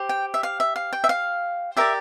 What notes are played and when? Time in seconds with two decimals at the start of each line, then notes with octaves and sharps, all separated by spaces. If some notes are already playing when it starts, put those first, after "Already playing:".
Already playing: G4 C5
0.09 G5
0.34 E5
0.43 F5
0.60 E5
0.76 F5
0.93 G5
1.04 E5
1.09 F5
1.77 G4 A#4 D5 E5